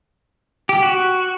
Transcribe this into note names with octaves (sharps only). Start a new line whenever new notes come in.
G4
F#4